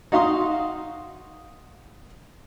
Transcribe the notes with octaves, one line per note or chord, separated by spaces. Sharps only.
D#4 F#4 F5 C6 D#6